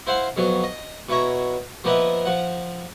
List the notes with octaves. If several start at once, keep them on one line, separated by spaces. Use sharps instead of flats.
E4 C5 F5 F#5 C6
F2 F#3 B3
D#5
B2 E4 C#5 A#5
F3 A#3 B3 B4 D#5 E5
F3 F#5